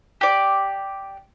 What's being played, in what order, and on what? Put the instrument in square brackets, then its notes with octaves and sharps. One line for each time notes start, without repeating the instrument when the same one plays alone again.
[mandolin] G4 D5